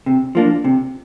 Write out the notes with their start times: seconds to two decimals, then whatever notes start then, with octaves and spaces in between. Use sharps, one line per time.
0.06 C3
0.35 F3 A#3 D4
0.64 C3